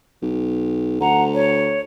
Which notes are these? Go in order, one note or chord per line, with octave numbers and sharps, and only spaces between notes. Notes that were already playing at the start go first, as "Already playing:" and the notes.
B1
D2 F#5 A#5
C#5